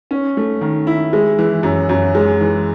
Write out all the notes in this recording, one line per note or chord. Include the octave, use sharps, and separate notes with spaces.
C#4
A3
D#3
E4
G#3
E3
F#2
F#2
G#3
E3